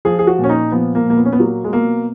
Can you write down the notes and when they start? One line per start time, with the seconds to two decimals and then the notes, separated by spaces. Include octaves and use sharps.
0.05 F3 G#4
0.19 G#4
0.27 F#4
0.39 A#2 C#4
0.49 D#4
0.72 F3 B3
0.95 A#3
1.06 A#2 A#3
1.17 B3
1.25 C#4
1.32 B3
1.39 F#3 A#3
1.64 G#3
1.72 B2 A#3